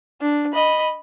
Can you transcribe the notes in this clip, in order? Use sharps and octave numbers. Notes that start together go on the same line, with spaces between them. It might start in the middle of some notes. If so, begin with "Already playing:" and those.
D4
D#5 B5